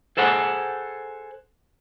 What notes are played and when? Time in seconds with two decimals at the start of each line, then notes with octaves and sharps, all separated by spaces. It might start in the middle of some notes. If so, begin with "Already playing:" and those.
0.17 G#4 A4 C5 F#5 G#5